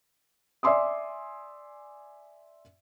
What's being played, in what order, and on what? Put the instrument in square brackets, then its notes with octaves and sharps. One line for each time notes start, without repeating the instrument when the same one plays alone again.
[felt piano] D5 E5 G#5 C6 D6 D#6